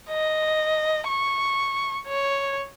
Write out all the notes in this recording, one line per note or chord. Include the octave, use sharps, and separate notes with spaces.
D#5
C#6
C#5